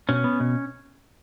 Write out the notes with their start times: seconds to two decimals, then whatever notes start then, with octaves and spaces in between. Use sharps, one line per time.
0.09 B2 C#4
0.24 B3
0.40 B2